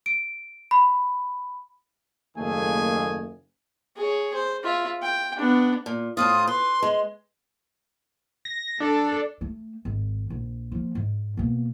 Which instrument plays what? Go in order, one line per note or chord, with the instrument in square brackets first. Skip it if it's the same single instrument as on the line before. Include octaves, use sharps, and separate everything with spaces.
[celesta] D7
B5
[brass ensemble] F#1 D#2 A3 G#4 G#5
[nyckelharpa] G#4 C#5
C5
F4 E5
G5
B3 D4
[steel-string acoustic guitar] A#2
[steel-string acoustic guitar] A2 C4 F4 [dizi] D#6
[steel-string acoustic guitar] B4 [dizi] C6
[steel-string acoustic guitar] G#3
[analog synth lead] A#6
[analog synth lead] D4 [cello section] A4
[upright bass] A3
G#1
A#1
F3 A#3
G#2
B2 A#3